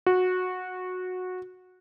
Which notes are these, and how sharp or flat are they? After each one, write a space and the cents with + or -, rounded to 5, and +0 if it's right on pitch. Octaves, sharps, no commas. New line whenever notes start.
F#4 -15